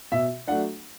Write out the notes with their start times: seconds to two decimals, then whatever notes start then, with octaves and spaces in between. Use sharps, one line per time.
0.12 B2 E5
0.47 F#3 A3 D4 F#5